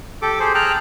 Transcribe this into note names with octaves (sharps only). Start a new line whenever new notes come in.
G4 A4 D6
G4 G#4 C5
G#4 G5 A5 A#5 F6 F#6